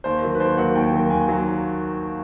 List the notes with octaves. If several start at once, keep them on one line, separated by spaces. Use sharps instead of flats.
D#2 C5
D#3 F#3 A#3
B4
D#2 C5
D#3 F#3 A#3 F#5
D#2 G5
D#3 F#3 A#3
D#2 G#5
D#3 F#3 A#3